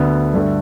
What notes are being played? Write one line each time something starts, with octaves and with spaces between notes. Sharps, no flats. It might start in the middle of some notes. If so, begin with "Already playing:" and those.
Already playing: D2 D3 B3
G2 D3 A3